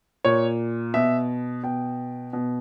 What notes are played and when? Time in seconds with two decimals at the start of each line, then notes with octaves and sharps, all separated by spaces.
0.25 A#2 C#5
0.94 B2 E5
1.63 B2 G5
2.33 B2